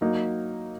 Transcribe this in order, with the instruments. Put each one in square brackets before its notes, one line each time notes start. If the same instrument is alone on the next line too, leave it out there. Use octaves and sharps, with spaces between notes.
[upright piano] F#3 A#3 D#4